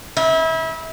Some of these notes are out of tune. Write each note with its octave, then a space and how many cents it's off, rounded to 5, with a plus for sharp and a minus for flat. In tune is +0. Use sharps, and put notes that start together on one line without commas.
E4 -30